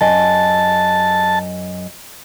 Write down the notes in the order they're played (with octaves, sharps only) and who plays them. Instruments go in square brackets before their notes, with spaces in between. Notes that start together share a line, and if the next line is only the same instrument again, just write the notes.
[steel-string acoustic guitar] F#2 D#5 G#5 [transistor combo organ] A5